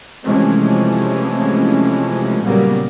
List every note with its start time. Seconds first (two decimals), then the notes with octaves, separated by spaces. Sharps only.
0.24 C3 E3 F3 G#3 A3 C#4
2.42 A#2 C#3 F#3 G3 A#3 B3